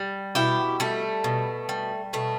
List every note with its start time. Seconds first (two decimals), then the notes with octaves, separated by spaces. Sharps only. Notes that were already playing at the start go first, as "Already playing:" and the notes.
Already playing: G3
0.35 B2 E4 G4
0.80 G3 A3
1.24 B2
1.69 G3
2.13 B2 A3